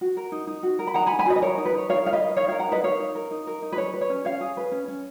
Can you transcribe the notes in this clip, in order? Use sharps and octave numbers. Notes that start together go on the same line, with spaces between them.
F#4
A#4
D#4
D#4
F#4
A#4
B5
D#4 F#5 A#5
G#5 B5
D#4
G#5 B5
F#4 B4 D#5
D#5
A#4 C#5
D#4
B4
D#4 C#5
A#4 C#5 F5
D#4 F5
B4 D#5
A#4
D#4 C#5 F5
A#4 C#5 F5
F#5 A#5
D#4 B4 D#5
A#4 C#5 F5
D#4
A#4
D#4
A#4
D#4
B4
G#4 C#5
B4
C#5
C#4
C#4 C#5 F5
G#4
B4
C#4
C#4